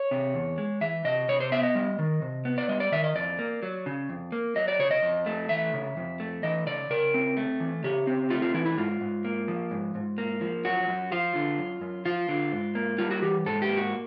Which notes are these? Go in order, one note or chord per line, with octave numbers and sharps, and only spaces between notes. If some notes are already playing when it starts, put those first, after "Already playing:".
Already playing: C#5
C3
E2
G#3
E3 E5
C3 D#5
C3 C#5
C5
B3 E5
D#5
G3
D#3
C3
B3
D5
G3 D#5
D5
D#3 E5
D#5
F2 D5
A#3
F#3
C#3
F2
A#3
F#3 D#5
D5
C#3 C#5
D#5
F2
A3
E3 E5
C#3
F2
A3
E3 D#5
C#3 D5
C#3 A#4
C4
A3
E3
C#3 G4
C4
A3 F4
F4
E3 E4
E4
G#2 F4
G#2
A#3
F3
G#2
G#2
A#3
F3
F#2 F#4
F#2
F3 F4
D3
F#2
F#2
F3 F4
D3
G#2
A#3
G3 F4
F#4
E3 G4
G#2 A4
G4
A#3
F#4